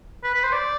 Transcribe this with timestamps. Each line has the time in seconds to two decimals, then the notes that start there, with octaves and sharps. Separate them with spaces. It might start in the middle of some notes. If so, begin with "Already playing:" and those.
0.24 B4
0.34 B4
0.43 C5
0.53 D5